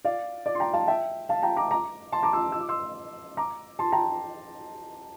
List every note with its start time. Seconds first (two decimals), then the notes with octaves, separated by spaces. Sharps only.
0.05 D5 F5
0.46 D5
0.55 C6
0.60 G5 A#5
0.73 F5 A5
0.88 E5 G5
1.29 F5 A5
1.43 G5 A#5
1.57 A#5 D6
1.71 A#5 D6
2.12 A5 C6
2.23 A#5 D6
2.33 C6 E6
2.52 E6
2.60 D6
2.69 C6 E6
3.37 A#5 D6
3.79 A5 C6
3.92 G5 A#5